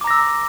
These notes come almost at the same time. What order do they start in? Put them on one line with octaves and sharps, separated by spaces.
D6 A#5 A#6 E6